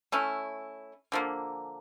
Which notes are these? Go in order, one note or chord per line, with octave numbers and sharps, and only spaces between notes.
A3 C#4 E4
D3 F3 A#3